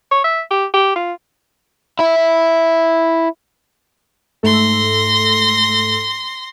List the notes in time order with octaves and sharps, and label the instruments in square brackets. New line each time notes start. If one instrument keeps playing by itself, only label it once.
[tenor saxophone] C#5
E5
G4
G4
F4
[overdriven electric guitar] E4 E5
[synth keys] G#2 A3 A4 [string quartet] C6 A#6